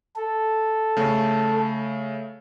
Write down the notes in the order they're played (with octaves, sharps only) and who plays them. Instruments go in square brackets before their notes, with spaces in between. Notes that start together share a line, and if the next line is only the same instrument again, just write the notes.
[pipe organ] A4
[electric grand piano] C#3 A3